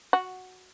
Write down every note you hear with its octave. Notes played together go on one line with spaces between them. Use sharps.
F#4